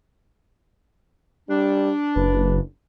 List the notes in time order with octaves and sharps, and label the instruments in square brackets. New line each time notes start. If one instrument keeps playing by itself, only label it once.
[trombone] G3 [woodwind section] D4
[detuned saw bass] F#1 [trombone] B4